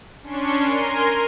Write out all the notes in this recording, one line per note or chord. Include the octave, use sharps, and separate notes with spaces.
C#4 D4 C6 C#6
A#4 G#5 C6